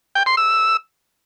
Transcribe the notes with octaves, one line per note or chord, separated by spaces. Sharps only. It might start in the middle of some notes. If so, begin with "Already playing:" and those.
G5
C6
E6